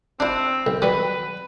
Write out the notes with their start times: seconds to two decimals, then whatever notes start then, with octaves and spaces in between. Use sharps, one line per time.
0.20 C4 D4 E4
0.66 B1
0.82 F#3 G3 B4